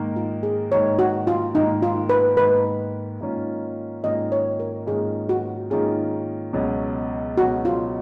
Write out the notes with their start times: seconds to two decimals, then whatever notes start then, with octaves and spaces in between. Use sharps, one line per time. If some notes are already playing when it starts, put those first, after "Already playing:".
Already playing: G#2 D#3 A#3
0.16 F4
0.43 G#4
0.71 G#2 D#3 A#3 C#5
0.99 F#4
1.27 F4
1.55 G#2 D#3 A#3 D#4
1.82 F4
2.09 B4
2.37 G#2 D#3 A#3 B4
3.20 G#2 D#3 A#3 C#4 F4
4.04 G#2 D#3 A#3 C#4 F4 D#5
4.32 C#5
4.60 A#4
4.87 G#2 D#3 A#3 C#4 F4 G#4
5.29 F#4
5.70 G#2 D#3 A#3 C#4 F4 G#4
6.53 C#2 B2 F#3 C#4
7.37 C#2 B2 F#3 C#4 F#4
7.65 F4